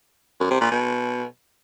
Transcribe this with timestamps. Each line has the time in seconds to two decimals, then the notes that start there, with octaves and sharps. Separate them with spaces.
0.40 F#2
0.50 C3
0.61 A#2
0.71 B2